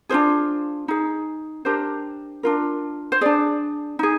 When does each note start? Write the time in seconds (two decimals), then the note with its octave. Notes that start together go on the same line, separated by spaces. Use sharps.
0.09 D4 F4 G#4 C5
0.88 D#4 G#4
1.65 D4 G4 A#4 C5
2.43 D4 F4 A#4
3.12 C5
3.21 D4 G#4 D5
3.99 D#4 G#4